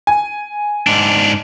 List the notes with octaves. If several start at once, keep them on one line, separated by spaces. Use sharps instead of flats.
G#5
G#2 D4